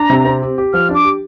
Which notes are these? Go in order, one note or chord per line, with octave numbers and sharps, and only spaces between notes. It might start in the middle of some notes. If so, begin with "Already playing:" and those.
Already playing: D4 A#5
C3
C4
G4
G4
F3 F6
D4
D6
G4